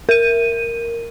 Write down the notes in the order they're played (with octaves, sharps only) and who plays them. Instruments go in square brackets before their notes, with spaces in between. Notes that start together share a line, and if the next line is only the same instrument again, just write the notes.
[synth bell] A#4 D#7